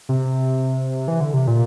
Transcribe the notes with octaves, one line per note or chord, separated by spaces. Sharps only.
C3
E3
D3
C3
A#2